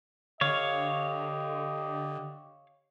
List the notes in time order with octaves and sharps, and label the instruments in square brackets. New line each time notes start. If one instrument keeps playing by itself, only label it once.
[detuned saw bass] D3 [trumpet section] G4 D#5 [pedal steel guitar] C#5 F5